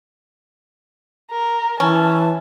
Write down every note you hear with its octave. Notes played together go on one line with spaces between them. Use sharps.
A#4
E3 C#4 A5